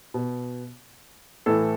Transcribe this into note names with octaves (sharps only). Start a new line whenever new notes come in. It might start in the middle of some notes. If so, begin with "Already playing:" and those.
B2
A2 E3 A4